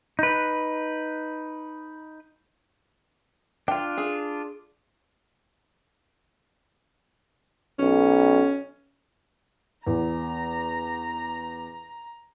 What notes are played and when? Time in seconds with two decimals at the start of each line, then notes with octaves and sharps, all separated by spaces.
0.19 D#4 B4
3.68 D4 F4 G5
3.98 G#4
7.79 B1 C#4
9.87 E2 A#5